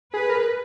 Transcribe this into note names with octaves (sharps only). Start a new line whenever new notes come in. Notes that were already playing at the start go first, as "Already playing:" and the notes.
G#4 B4
A#4